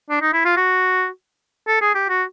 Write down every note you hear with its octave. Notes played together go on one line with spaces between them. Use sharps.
D4
D#4
E4
F4
F#4
A4
G#4
G4
F#4